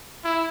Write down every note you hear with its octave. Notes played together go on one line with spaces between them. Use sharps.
E4